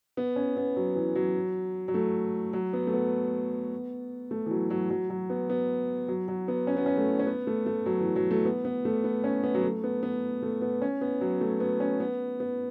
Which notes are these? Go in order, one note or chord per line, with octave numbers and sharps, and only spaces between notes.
B3
C#4
B3
F#3
E3
F#3
F#3
A3
F#3
B3
A3
B3
A3
E3
F#3
F#3
F#3
F#3
B3
B3
F#3
F#3
B3
C#4
B3
C#4
A3
C#4
B3
A3
A3
F#3
E3
F#3
A3
B3
B3
A3
B3
C#4
B3
F#3
A3
B3
B3
A3
B3
C#4
B3
F#3
A3
B3
C#4
B3
B3